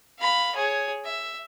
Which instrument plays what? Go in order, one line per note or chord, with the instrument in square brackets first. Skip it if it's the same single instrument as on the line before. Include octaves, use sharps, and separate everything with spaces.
[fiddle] F5 B5
G#4 C#5
E5